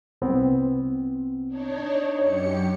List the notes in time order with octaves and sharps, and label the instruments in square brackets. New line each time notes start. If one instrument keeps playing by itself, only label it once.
[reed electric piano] C2 B3 C4
[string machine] D4 D#4 C#5
[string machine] F#2 G4 C#7 [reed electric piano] C#5